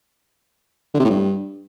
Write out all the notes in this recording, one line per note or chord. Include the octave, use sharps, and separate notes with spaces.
D3
C3
A2
G2